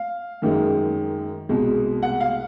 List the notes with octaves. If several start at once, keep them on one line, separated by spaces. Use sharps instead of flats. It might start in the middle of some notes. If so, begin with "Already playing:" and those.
Already playing: F5
F#2 D#3 G#3
C2 B2 G#3
F#5
F5